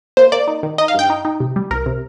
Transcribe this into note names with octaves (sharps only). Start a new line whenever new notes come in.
A#3 C5
A#3 D5
D#4
D#3
D#4 D#5
F5
G2 G5
D#4
D#4
C3
G3
C2 A#4
C3